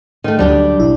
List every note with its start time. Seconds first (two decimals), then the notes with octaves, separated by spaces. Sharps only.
0.24 D#3 A3
0.39 D2 F#3 G3 D4 G4
0.79 A1 B2 E4